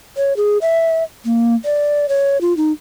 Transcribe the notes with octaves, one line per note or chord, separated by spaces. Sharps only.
C#5
G#4
E5
A#3
D5
C#5
F4
D#4